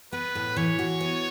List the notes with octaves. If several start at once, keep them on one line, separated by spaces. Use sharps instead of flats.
B3 B4
A2
E3 C#5
F#4
B3